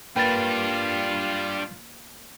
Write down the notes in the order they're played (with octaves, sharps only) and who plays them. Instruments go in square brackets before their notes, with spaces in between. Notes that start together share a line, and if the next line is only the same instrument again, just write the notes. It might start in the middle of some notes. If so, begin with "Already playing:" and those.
[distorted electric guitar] G3 D4 [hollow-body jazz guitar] A#3 B4 [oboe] F4 [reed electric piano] G5 A6